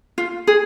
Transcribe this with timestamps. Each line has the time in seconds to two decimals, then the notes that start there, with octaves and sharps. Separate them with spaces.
0.18 F4
0.47 G#4